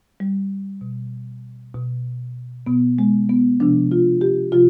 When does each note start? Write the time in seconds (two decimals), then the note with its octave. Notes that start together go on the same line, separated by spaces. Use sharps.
0.20 G3
0.81 B2
1.74 B2
2.67 B2 B3
2.99 G#3
3.29 B3
3.60 C3 F3 D4
3.91 F4
4.21 G4
4.52 C3 F3 F4